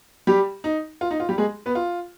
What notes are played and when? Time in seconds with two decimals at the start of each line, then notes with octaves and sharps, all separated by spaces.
0.27 G3 G4
0.64 D#4
1.01 F4
1.11 D#4
1.20 F4
1.29 G3 G4
1.38 G#3 G#4
1.66 B3 B4
1.75 F4